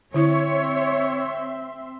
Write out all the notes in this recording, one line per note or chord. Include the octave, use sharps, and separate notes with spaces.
D3 C4 E4 C#5 E5 C6